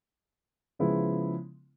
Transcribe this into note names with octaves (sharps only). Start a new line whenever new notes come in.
C#3 F3 G#3 B3 E4